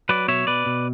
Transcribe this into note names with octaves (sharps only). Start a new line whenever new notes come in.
F#3 B4 D5
B2 C#5 E5
B2 B4 D5
B2